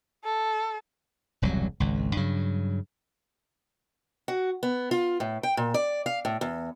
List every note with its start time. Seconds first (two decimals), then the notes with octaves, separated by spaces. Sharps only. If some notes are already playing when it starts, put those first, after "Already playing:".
0.24 A4
1.42 E1 C2 G2 F#3
1.80 G#1 C#2
2.17 G2 C#3 F#3
4.28 F#4
4.63 B3
4.91 F4
5.20 A2
5.43 G5
5.57 A#2
5.74 D5
6.06 F5
6.25 A2
6.41 E2